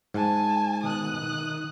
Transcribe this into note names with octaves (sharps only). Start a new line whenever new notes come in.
G#2 G#5 A5
B2 D#3 D#6 F#6
D#3